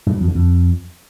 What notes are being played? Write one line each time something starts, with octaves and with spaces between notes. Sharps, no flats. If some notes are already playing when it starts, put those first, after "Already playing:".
G2
F#3
F2
D3
F2